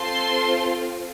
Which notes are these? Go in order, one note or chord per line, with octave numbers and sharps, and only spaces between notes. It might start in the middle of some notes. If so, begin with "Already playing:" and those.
Already playing: C4 F4 A4 A5 C6